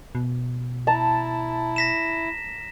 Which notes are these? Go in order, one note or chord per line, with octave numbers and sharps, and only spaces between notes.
B2
E4 A5 A#5
A#6 B6 E7